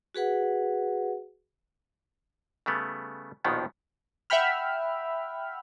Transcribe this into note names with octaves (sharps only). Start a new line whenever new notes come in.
F#4 G#4 B4 F#5
C#3 G3 A3 B3
A#1 D#2 B2 D#3 F3 B3
E5 F#5 G5 B5 F6